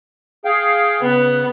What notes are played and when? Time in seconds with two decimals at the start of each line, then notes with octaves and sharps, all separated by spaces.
0.45 G#4 F5 G5
1.02 C#3 B3 F#6